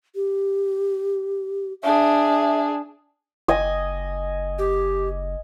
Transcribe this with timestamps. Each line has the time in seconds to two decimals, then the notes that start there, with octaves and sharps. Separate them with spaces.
0.15 G4
1.83 D4 G#4 E5
3.48 F#1 D#5 G#5
4.59 G4